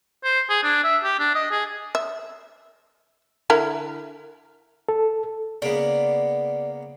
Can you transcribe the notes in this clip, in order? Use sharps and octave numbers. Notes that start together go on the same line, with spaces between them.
C5
G#4
D4
E5
G4
D4
D#5
G#4
E5
D3 E4 A#4
A4
C#3 A#3 B3 D5